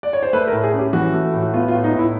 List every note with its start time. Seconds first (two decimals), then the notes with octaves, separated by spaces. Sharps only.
0.03 D5
0.13 C#5
0.23 C5
0.33 A3 B4
0.48 A#4
0.53 A2
0.63 G#4
0.74 C#4 G4
0.93 E3 F#4
1.13 A3
1.33 A2
1.42 F#4
1.54 B3 F4
1.68 F4
1.74 A2
1.84 D#4
1.93 A2
1.99 E4